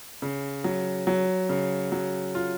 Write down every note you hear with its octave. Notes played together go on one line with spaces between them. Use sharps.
C#3
F#3
F#3
C#3
F#3
F4